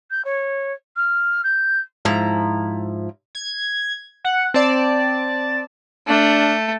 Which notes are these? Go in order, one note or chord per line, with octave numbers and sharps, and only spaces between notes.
G6
C#5
F6
G6
G#2 F3 E4 A#5
G#6
F#5
C4 D5 A5
A3 D4